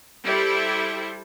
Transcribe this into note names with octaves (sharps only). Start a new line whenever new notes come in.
G3 E4 G4 A4 C5 E5